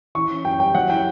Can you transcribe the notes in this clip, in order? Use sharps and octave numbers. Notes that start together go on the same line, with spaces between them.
E3 C#6
C#4
F#2 G5
G3 G5
F#3 F#5
E4 G5